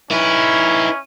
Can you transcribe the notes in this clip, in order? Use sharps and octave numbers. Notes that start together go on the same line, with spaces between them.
C#4 D#4 E4 B4